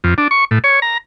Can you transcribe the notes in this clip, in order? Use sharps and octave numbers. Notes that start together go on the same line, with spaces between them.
F2
D4
C#6
A2
C#5
A#5